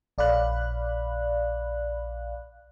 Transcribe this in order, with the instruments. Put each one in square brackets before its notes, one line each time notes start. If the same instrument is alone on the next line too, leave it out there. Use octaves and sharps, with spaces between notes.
[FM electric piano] A#1 D5 F5 B5 F#6